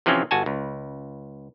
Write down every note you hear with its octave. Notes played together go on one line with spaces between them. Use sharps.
C3 E3 F3 C4 C#4
G1 F#4 G#5 A5
C#2